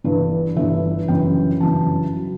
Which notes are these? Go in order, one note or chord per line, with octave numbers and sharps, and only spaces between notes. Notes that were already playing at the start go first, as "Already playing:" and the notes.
G1 G2 E3
G1 G2 E3 E5
G1 F#2 C#3 E3 G5
G1 F#2 C#3 E3 A5
F#3